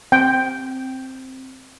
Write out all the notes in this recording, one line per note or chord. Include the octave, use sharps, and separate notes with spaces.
C4 G5